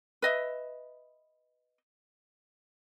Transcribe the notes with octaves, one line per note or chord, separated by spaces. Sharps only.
B4 D#5 E5